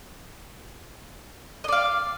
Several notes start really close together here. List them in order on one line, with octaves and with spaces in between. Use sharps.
D#5 D5 F5